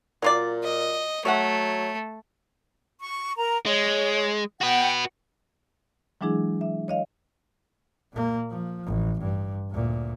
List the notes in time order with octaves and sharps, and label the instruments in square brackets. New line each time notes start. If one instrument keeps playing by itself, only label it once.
[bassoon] A#2 [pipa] F#3 F4 D5
[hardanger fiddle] D#5
[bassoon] F#3 [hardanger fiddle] A3 [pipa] C#5 E5 F#5
[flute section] C#6
A#4 A#5
[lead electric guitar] G#3 [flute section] C#5
[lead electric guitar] F#4 B4 [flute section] F#5 G5
[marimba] E3 F#3 G#3 D4 E4 G#4
E5
C#5 D#5 F5
[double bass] A#2 A#3
F3
A1
G2
D2 A#2